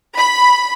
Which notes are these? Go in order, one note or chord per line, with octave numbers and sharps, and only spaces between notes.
B5